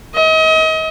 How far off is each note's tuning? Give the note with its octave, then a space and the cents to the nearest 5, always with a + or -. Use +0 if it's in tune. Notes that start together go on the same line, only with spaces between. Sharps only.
D#5 +35